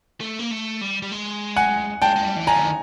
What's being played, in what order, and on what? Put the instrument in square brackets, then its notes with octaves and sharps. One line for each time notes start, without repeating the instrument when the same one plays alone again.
[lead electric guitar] A3
A#3
A3
G3
G3
G#3
[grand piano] F#5 G#5
[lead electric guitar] G#3 [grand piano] G5 A5
[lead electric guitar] G#3
G3
E3
[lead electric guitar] F3 [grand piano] G#5 A#5
[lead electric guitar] D3
D#3